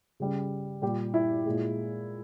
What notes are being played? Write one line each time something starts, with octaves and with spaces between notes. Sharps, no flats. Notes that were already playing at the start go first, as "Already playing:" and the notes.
C#3 G3
A#2 G3 G4
E4
A#2 G#3